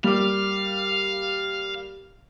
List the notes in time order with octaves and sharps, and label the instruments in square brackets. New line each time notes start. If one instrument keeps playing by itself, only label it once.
[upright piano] G3 A#3 D6 [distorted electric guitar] F5